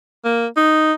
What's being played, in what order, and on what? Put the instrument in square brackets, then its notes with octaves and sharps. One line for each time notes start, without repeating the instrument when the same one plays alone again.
[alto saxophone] A#3
D#4